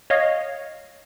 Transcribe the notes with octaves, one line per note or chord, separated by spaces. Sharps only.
C#5 D#5 F5